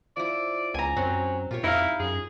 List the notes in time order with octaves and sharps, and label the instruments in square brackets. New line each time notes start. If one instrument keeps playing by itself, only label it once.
[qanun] F3 E4 [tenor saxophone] D5
[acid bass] C#2 [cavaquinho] G#5 A#5
[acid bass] F#2 [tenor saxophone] F#3 [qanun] C4
[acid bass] A#2 [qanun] F4 G4 C#5
[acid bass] F2 [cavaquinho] D#4 F5 [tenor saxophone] E4
[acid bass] F#2 [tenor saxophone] G#4